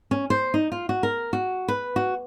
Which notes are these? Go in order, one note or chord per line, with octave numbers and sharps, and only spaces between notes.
C#4
C5
D#4
F4
F#4
A#4
F#4
B4
F#4